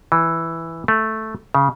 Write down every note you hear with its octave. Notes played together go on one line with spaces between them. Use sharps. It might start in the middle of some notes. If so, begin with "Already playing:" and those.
E3
A3
C#3